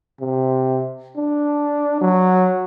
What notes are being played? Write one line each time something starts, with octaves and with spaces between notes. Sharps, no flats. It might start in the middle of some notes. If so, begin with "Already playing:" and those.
C3
D4
F#3